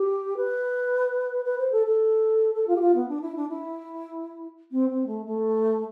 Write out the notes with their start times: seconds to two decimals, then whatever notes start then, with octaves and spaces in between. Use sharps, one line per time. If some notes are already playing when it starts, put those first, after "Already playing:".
Already playing: G4
0.37 B4
1.44 B4
1.58 C5
1.72 A4
1.86 A4
2.54 A4
2.67 F4
2.76 G4
2.80 F4
2.95 B3
3.08 D4
3.21 E4
3.36 D4
3.49 E4
4.71 C4
4.89 C4
5.06 A3
5.26 A3